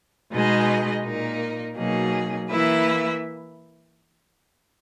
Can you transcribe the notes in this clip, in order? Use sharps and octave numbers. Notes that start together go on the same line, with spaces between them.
B2 G#3 D#4 G#4 D#5
A#2 A#3 D#4 A#4
B2 F#3 A#3 D#4 G#4
E3 A#3 E4 B4 E5